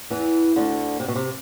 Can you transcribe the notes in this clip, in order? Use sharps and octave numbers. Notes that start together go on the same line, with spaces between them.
E2 E3
D2 D3
C3
B2
C3